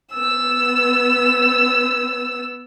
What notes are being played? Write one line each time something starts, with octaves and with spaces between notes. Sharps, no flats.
B3 E6